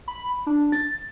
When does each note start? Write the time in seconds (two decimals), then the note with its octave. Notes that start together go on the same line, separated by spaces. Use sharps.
0.08 B5
0.47 D4
0.72 A6